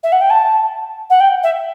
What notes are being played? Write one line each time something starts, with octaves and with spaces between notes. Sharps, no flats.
E5
F#5
G5
A5
F#5
G5
E5